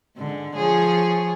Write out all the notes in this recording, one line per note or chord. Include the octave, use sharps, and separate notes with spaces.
G#2 D3
F3 G#4 C#5